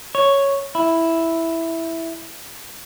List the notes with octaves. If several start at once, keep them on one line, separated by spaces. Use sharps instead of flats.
C#5
E4